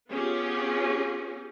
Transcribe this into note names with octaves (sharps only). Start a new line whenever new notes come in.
B3 C#4 F4 G4 G#4